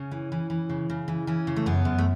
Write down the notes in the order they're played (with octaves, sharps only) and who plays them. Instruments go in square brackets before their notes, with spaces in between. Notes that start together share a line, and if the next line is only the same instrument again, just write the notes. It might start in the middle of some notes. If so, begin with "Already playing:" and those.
Already playing: [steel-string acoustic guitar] C#3 C#4
E3
E3
E3
C#3
C#3
E3
E3 C#4
C#3
A3
F#2 B3
F#2
A3